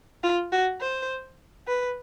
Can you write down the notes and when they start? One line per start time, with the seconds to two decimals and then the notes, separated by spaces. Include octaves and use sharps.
0.23 F4
0.52 F#4
0.80 C5
1.67 B4